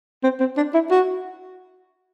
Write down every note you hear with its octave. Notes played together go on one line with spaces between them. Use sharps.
C4
C4
D4
E4
F#4